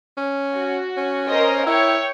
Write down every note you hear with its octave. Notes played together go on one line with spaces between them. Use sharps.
C#4
F#4
C#4
A#4 C5 D#5
E4 C#5 G5